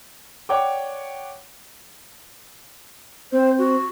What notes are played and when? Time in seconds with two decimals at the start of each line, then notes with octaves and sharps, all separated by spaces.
0.49 C#5 D5 F#5 G5 C#6 D6
3.32 C4 C5
3.58 F#4